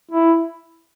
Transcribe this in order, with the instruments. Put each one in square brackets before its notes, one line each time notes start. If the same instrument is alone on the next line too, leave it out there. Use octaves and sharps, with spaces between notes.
[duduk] E4